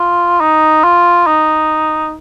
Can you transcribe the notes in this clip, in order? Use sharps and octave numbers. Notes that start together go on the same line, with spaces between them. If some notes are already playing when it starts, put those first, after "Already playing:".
Already playing: F4
D#4
F4
D#4